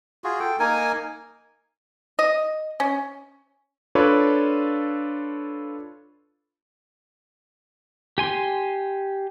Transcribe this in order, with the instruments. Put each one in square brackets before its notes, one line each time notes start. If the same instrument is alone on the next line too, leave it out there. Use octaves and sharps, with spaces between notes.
[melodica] F4 F#4 G#4
A4 G5
A#3 D#4 A#4 G#5
[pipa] D#5
C#4
[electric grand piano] D4 F4 A4 B4 C#5 D5
[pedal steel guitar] G4 G#5 C6